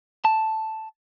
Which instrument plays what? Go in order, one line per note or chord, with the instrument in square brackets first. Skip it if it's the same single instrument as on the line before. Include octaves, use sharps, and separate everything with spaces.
[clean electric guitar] A5